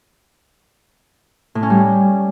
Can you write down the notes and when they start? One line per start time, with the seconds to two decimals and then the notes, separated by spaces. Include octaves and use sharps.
1.55 A2
1.63 C#4
1.70 G3